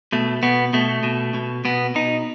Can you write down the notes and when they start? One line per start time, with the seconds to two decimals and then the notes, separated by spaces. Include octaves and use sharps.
0.12 B2 A3
0.43 B2 B3
0.73 B2 A3
1.03 B2
1.34 B2
1.65 B2 B3
1.95 B2 D#4